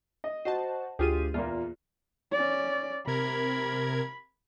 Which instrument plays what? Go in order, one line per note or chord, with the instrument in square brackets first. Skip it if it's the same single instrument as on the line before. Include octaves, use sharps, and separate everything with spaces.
[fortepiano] D#5
[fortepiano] F#4 [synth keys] C5 D#5 A5
[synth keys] D2 F4 D#7 [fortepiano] G4 G#4
[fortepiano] E2 A#2 A#3 [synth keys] F4
[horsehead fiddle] C#4 D5
[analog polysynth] C3 A#4 G#6 [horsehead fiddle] B5